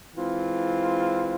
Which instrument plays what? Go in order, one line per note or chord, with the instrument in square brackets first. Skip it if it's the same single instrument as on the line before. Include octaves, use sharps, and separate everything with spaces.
[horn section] E3 G#3 C4 F4